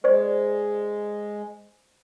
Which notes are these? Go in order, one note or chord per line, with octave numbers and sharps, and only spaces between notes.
G#3 C5 D5